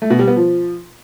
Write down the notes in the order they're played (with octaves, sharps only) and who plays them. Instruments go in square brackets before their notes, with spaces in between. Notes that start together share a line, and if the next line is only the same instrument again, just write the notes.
[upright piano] A3
B2
G3
B3
F3